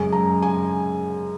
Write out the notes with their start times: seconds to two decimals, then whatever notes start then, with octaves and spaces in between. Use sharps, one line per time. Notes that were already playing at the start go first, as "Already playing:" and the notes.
Already playing: F#2 C#3 G#3 G#5
0.12 A#5
0.42 G#5